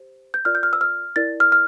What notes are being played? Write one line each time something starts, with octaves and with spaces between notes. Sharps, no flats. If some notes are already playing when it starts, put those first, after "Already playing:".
Already playing: G4 C5
G6
F4 A#4 D5 F6
G6
F6
E6
F6
E4 A#4 D5 A6
F6
F6